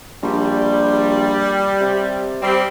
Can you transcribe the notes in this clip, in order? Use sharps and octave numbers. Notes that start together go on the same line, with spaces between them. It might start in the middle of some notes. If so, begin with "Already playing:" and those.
A#1 G3
C3
G3 C4